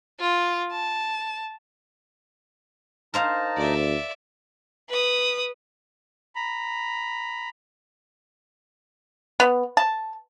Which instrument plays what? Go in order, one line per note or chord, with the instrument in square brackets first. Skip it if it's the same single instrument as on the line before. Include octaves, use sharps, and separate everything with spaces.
[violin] F4
A5
[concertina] D#4 A5 A#5 [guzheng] A#4 C5 F5
[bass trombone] D2 [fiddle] D5 E5
[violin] B4 D#6
[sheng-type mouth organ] A#5 B5
[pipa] B3
A5